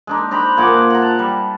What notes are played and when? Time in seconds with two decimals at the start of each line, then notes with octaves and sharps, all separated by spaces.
0.07 G#3 D4 D#4
0.31 D4 C5 A#5 B5
0.57 A#2 G#4 F#5 D6
0.90 F#5 A#5
1.02 A5
1.19 G3